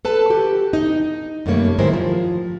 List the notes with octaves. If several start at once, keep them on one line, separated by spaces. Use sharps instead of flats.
A4 B4 A5
F#4 G4
D#4
F#2 B2 G3 A3 A#3 C#5
G#2 D#3 G#3 E4 A#4 C5
F3